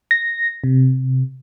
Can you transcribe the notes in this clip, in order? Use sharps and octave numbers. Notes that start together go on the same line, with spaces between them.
A#6
C3